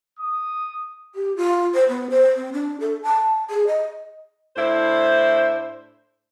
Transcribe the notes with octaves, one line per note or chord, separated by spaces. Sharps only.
D#6
G4
F4
C5
B3
C5
C4
D4
A4
A5
G#4
D#5
A2 D4 E4 C5